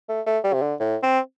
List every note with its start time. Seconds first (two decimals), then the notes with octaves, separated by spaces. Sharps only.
0.09 A3
0.26 A3
0.44 G3
0.54 C3
0.62 D3
0.80 A2
1.03 C4